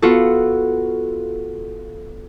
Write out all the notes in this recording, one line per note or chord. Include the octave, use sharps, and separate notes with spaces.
B3 F4 F#4 A4